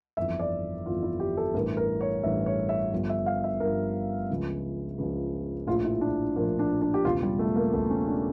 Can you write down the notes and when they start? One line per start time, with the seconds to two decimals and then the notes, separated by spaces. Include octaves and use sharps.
0.17 G1 F2 E3 E5
0.40 D5
0.86 G1 F2 E3 F4
1.03 E4
1.20 G4
1.37 A4
1.54 A1 G2 E3 A#4
1.77 A#4
2.01 C#5
2.23 A1 G2 E3 E5
2.46 C#5
2.69 E5
2.92 G1 G2 F3
3.09 E5
3.26 F5
3.44 E5
3.60 G1 G2 F3 A#4
4.30 C#2 C#3 F3
4.98 C#2 C#3 F3
5.67 A#1 A2 F3 F4
5.84 E4
6.01 D4
6.35 A#1 A2 F3 A#3
6.59 D4
6.81 D4
6.94 G4
7.05 E1 E2 C#3 F4
7.22 G3
7.39 A3
7.56 A#3
7.73 E1 E2 C#3 A3
7.90 C#4
8.08 D4